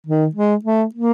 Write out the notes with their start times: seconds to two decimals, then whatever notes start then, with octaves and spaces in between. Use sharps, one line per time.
0.07 D#3
0.35 G#3
0.64 A3
0.94 A#3